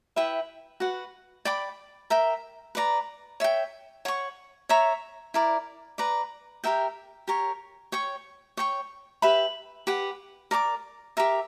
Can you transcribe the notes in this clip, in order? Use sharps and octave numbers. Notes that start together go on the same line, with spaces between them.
E4 B4 E5 G5
F#4 B4 F#5
D5 G5 B5 D6
A#4 E5 G5
B4 D5 A#5
C#5 E5 G5
C#5 F#5 C#6
C#5 E5 A#5 C#6
E4 A#4 D5
B4 D5 A#5
G4 A#4 E5 G5
G4 A#4 C#5
C#5 G5 C#6
C#5 G5 C#6
G4 B4 E5 B5
G4 B4 F#5
A#4 D5 A#5 D6
G4 A#4 E5